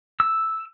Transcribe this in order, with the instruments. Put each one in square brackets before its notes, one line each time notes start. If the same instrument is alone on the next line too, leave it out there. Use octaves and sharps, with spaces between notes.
[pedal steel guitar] E6